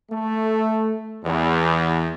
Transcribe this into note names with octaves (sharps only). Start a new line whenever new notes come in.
A3
E2